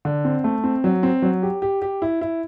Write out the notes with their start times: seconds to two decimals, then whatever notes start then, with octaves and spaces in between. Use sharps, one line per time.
0.05 D3
0.25 C4
0.44 A3
0.64 C4
0.84 F#3
1.03 C4
1.22 F#3
1.43 G4
1.62 G4
1.82 G4
2.02 E4
2.21 E4